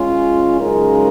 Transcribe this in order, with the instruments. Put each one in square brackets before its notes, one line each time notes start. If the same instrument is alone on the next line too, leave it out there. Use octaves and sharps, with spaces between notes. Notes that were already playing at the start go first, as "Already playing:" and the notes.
Already playing: [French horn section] G#3 C#4 F4
F#2 C#3 G#3 D#4 A#4